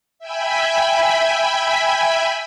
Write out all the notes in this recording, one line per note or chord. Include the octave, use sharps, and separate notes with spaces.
E5 G5 G#5 B5